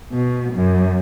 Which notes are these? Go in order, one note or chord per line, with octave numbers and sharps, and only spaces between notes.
B2
F#2